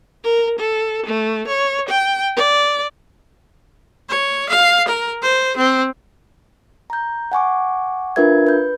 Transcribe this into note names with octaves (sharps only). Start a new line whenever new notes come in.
A#4
A4
A3
C#5
G5
D5
C#5
F5
A#4
C5
C4
A#5 G6
F#5 G#5 C#6 D6
D4 F4 A#4 B4 E5 G#6
B4 G6